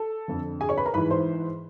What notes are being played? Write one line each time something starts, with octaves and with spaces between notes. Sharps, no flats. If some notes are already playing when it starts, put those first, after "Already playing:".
Already playing: A4 A5
F2 D3
G#4 G#5
C#5 C#6
B4 B5
A#4 A#5
G#2 E3 B4 B5
C5 C6